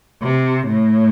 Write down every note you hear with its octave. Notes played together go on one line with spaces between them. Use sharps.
C3
A2